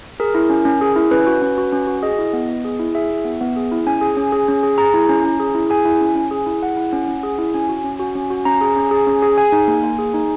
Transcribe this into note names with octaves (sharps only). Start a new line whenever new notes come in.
G#4 A#4
E4
C#4
C#4
G#4
E4
C#4 B4
F#4
C#4
F#4
C#4
F#4
G#4 D#5
E4
B3
B3
G#4
E4
G#4 E5
E4
B3
B3
G#4
E4
C#4 G#5
G#4
C#4
G#4
C#4
G#4
G#4 A#5
E4
C#4
C#4
G#4
E4
G#4 G#5
E4
C#4
C#4
G#4
E4
G#4 F#5
E4
C#4
C#4
G#4
E4
C#4 G#5
F#4
C#4
F#4
C#4
F#4
C#4 A#5
G#4
C#4
G#4
C#4
G#4
G#4 G#5
D#4
A#3
A#3
G#4
D#4